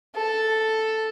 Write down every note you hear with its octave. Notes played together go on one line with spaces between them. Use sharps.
A4